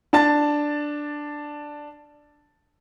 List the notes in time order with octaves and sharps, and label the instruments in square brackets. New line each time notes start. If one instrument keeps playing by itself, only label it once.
[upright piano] D4 A5 A6